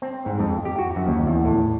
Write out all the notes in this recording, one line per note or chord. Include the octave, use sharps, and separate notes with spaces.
C4
G#2
F2
G4
F#4
F#2
D#2
E2
A2